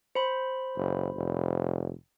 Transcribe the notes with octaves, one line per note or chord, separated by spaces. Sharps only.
C5 B5
F#1
F1